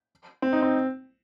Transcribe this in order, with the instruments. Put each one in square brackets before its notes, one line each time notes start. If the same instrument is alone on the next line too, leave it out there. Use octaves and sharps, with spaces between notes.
[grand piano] C4
D#4
C4